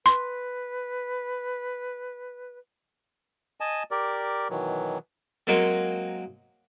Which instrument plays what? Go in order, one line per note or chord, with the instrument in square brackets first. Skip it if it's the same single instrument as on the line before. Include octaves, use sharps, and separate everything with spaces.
[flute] B4 [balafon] C6
[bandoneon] D#5 G#5 A5
G4 A#4 D5
B2 D#3 E3 F#3
[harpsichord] F#3 G#3 A#3 C4 F#4